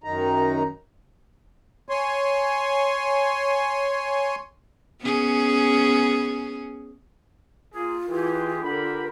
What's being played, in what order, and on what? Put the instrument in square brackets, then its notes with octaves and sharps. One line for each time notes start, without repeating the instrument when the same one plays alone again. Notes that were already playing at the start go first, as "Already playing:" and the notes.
[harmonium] F#2 D#3 D#4 A#5
[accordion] C#5 G#5 C6
[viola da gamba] B3 C#4 G#4
[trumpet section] A#3 G#4 [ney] F4
[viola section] E3 [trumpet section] G4 G#4
[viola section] D3 A#4 [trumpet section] G4 F#5 B5